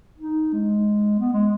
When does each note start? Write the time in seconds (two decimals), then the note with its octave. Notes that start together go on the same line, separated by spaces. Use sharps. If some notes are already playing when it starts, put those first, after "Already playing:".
0.20 D#4
0.53 G#3
1.20 B3
1.33 G#3